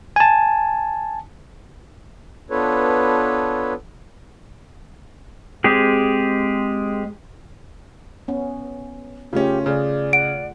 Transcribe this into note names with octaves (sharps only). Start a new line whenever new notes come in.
G#5 A5
B3 D4 F4 A4 B4 C#5
G#3 C4 G4 G#4
B3 C#4
C#3 A3 C#4 F4 G4
C#3 G#4 D5
F#5 D7